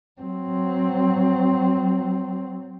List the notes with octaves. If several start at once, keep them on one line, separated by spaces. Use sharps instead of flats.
F#3 C4